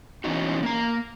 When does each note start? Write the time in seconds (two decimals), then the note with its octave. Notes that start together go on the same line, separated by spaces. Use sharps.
0.24 B2 E3 C#4 D#4 F#4
0.63 A#3 A#5